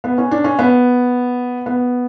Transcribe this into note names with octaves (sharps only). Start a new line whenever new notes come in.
B3
C#4
D4
C#4
B3
B3